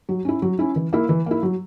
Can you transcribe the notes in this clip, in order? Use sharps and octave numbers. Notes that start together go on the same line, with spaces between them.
F#3
C#4 E4
F#3
C#4 E4
E3
A#3 E4
E3
A#3 E4
F#3